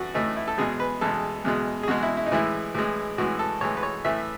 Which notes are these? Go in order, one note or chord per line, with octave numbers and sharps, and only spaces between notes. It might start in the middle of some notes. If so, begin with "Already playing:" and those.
Already playing: A2 E3 A3 F#4
A2 E3 A3 D#4
E4
A4
E2 B2 G#3 G#4
B4
E2 B2 G#3 A4
E2 B2 G#3
G#4
E2 B2 G#3 F#4
E4
E4
D#4
A2 E3 G#3 E4
A2 E3 G#3
A2 E3 G#3 F#4
A4
A2 E3 G#3 C#5
B4
C#5
A2 E3 A3 E5